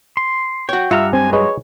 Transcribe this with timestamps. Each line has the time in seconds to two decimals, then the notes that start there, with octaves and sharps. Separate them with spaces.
0.17 C6
0.69 F#4 C#5 G5
0.91 G2 F4 E5 F#5 A#5 F6
1.13 F#3 G#3 C4 G#5
1.33 G#4 B4 C#5 D#5